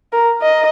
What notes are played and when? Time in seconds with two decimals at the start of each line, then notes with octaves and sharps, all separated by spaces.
0.12 A#4
0.41 D#5